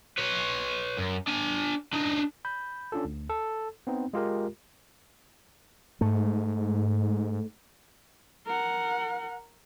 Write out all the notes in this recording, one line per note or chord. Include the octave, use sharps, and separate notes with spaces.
B4 C#5
F#2
D4 G#5
D4 D#4
B5 G6
C#4 D4 F4 A4
D2
A4
B3 C4 D#4
G#3 F4 G4 A#4
G#2 A3
A#4 F#5